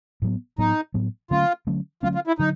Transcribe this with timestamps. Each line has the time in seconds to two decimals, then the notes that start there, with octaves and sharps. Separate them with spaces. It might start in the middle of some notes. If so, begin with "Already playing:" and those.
0.22 A2 F#3 B3
0.58 A2 F#3 B3 D#4
0.94 A2 F#3 B3
1.31 D3 F#3 A3 C#4 F4
1.67 D3 F#3 A3 C#4
2.03 D3 F#3 A3 C#4 F4
2.15 F4
2.27 E4
2.39 D3 F#3 D#4